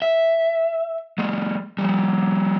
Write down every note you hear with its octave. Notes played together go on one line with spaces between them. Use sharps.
E5
F#3 G#3
F3 G3